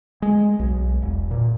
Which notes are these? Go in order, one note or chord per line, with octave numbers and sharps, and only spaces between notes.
G#3
B1
E1
A#2